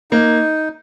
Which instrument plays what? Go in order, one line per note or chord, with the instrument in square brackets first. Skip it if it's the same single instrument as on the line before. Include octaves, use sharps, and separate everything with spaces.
[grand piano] A#3 [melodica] D#4